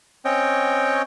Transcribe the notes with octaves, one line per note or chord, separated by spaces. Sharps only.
C4 C#4 C#5 D#5 G5